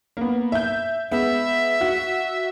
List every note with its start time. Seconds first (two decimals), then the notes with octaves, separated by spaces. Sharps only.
0.17 A#3 B3
0.52 E5 G6
1.12 G#3 B3 E5
1.81 F#4